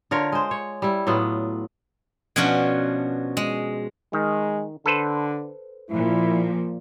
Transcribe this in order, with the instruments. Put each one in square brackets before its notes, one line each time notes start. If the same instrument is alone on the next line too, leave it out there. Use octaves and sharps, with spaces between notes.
[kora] D3 F4 A#4 C#5
G#3 C5
C#5
G3 E4
A2 F#3 B3 F4
[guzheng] B2 F3 C#4 D4 F#4
G#3
[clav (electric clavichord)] D#3 [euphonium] G#3
[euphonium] D3 [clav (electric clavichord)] A4 B4 C5
[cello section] A#2 F3 [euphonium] E4